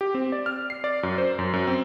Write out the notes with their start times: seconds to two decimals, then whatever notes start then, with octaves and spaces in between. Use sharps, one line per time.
0.01 G4
0.15 C4
0.32 D5
0.46 F6
0.70 C7
0.84 D5
1.03 F#2
1.18 C5
1.39 F#2
1.53 F#2
1.67 C4